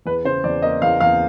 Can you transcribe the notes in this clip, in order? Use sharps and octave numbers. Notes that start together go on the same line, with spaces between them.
E2 B4
C#3 C5
E2 D5
A#3 D#5
E2 F5
E2 F5